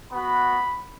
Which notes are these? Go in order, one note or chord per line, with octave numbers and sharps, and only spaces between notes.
B3 F#4 B5